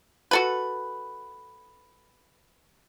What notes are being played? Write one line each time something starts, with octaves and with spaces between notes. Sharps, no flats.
F#4 A4 B4